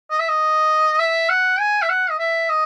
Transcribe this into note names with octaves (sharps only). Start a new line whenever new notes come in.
D#5
E5
D#5
E5
F#5
G#5
E5
F#5
D#5
E5
D#5